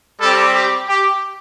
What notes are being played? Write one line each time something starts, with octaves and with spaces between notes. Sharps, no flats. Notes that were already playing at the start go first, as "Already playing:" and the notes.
G3 C4 G4 A4
G4
G4